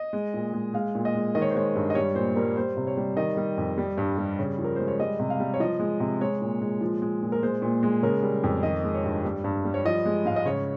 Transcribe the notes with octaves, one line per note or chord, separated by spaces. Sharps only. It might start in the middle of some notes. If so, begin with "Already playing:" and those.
Already playing: D#5
G#3
A#2
G#3
G#3 F5
A#2
D#5
G#3
D#3 D#5
C#5
C5
G#3 C#5
G2
D#5
G3 C#5
A#2 C5
G3 A#4
G3 C5
C3
C#5
G3
D#3 D#5
G3
F2
G3
G2
G3
C#3
F3
A#4
G#3 C5
C#5
G3 D#5
C3
F5
G3
C#5
F3 D#5
G#3
C3
G#3 C#5
A#2
G#3
F3
G#3
A#2
A#4
G#3 C5
A#2
G#3
C#3 A#4
G3
F2
D#3 D#5
G#3
C#5
G2
G3
G2
G3
C#5
F3 D#5
G#3
G#2 F5
D#5
C#3 C#5